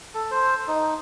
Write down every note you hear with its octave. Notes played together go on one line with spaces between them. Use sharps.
A4
C5
D#4